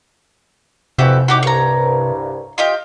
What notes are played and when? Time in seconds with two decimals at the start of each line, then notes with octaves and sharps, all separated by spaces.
0.99 F2 C3 E3 F#4 G4 E5
1.28 A2 D#4 F#4 G4 D6
1.43 C2 G2 C#5 A#5
2.58 F4 G4 D#5 G5